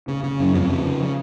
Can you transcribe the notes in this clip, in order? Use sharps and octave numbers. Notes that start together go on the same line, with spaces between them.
C#3
C#3
F#2
F2 F3
C#3
C#3